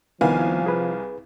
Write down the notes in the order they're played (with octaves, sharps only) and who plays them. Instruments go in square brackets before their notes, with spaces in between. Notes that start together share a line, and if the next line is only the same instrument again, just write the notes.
[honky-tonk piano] C2 F5 G#5 [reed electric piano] D#3 B3 E4 [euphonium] F3
[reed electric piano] G#4 B4